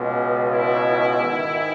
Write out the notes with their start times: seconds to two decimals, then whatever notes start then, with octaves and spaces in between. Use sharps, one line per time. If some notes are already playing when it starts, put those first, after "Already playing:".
Already playing: C#2 B2
0.50 E4
1.20 G#2 D#3